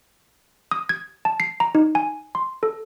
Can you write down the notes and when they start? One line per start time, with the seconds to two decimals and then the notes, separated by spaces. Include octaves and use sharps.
0.71 D#6
0.89 G#6
1.25 A5
1.40 C7
1.60 A#5
1.75 D#4
1.95 G#5
2.35 C6
2.63 A4